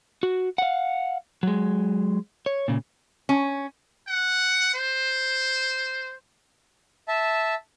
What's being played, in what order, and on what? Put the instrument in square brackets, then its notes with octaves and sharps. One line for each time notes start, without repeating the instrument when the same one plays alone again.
[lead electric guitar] F#4
F5 F#5
F#3 G#3
C#5
A#2 C#3
[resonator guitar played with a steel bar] C#4
[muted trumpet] F#5
C5
[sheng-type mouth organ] E5 A5